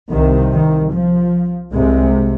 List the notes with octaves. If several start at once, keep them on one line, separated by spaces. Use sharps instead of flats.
C2 C3 D#3
D#3
F3
C2 C3 G#3